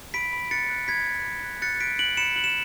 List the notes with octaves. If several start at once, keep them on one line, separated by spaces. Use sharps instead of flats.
B5 B6 D7
B5
F#6 A6 C#7
F#6
B5 G#6 B6
B5
B5
F#6
F#6 A6 C#7
F#6 B6 D7
F#6 D7 F#7
B5 C#7 E7
F#6 F#7
E7